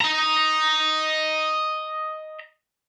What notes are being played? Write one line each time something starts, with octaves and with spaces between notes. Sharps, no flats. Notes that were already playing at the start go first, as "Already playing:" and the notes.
D#5 A#5